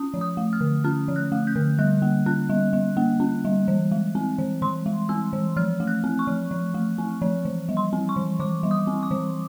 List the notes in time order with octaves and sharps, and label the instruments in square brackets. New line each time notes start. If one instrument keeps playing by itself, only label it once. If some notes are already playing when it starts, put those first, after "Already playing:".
Already playing: [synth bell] C#4 D#6
F3
D#6
A3
F6
D3
C#4 F6
F3
F#6
A3
G6
D3
G3 F#6
A#3
C#4 F#6
G3
G3
A#3
C#4
G3
E3
G#3
C4
E3
E3 C6
G#3
C4 E6
E3
F3 F6
A3
F#6
C4
C#6
F3
F3
A3
C4
F3
E3
G3
C6
C4
C#6
E3
E3 D6
G3
D#6
C4
D6
E3